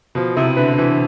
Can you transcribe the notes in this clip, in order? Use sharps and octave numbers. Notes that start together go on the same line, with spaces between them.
B2 F3
C3 E4
D3 B4
D3
E3 E4